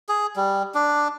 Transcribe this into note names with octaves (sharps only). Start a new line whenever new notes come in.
G#4
G3
D4